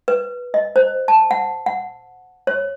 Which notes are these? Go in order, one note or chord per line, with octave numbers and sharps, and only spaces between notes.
B4
D#5
C5
A5
F#5
F#5
C#5